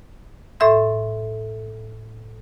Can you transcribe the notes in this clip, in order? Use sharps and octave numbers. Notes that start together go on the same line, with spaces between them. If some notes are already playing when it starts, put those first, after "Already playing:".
A2 A4 E5 C6